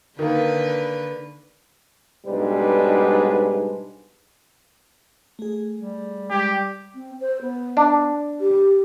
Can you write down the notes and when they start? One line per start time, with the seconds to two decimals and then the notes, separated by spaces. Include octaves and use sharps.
0.19 D3 D#3 A#3 B4
2.26 B1 G#2 G3 G#3 D4 B4
5.39 A3 G#4
5.79 G3
6.30 G#3 G4 D5 G#6
6.94 C4
7.20 C5
7.41 B3
7.77 D4
8.40 G4